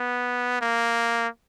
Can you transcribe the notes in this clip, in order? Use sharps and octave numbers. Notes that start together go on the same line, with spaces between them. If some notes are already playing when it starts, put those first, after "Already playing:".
Already playing: B3
A#3